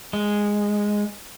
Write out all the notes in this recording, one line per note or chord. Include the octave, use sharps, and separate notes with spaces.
G#3